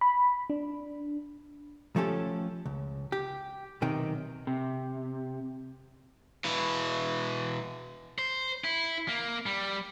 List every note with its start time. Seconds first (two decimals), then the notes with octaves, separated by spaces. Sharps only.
0.01 B5
0.50 D4
1.96 F3 A3 C#4 G4 A4
2.66 C#2
3.12 G4
3.82 B1 C3 D#3 G5
4.47 C3
6.44 B2 E3
8.18 C5
8.64 E4
9.08 A#3
9.46 G3